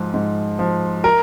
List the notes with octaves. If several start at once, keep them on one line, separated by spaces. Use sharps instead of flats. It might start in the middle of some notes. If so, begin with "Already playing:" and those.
Already playing: G#2 F3
G#2
F3
A#4